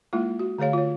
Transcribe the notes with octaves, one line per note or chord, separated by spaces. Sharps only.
G#3 A#3 E4 F4
F#4
D3 A3 G#4 C#5 F5
F4 C#5